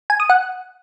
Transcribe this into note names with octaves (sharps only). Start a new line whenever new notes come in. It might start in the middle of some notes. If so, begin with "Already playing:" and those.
G#5
D#6
F#5